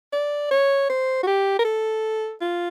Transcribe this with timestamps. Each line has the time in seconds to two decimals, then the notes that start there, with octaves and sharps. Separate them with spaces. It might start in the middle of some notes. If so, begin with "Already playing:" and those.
0.13 D5
0.51 C#5
0.90 C5
1.23 F#4
1.27 G4
1.59 A#4
1.65 A4
2.41 F4